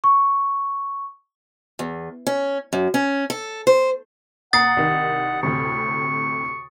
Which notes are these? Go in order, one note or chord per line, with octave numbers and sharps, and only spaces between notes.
C#6
E2
C#4
F#2
C#4
A4
C5
A#2 F#5 A#5 D#6 A6 C7
C2 D#3
D2 A2 C3 C#6